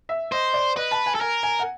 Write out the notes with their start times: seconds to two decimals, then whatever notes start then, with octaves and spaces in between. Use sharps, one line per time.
0.09 E5
0.32 C5 D#5
0.54 D5
0.76 B4 D#5
0.91 A5
1.06 G#5
1.15 A4
1.21 A#4 G#5
1.43 G#5
1.59 F#5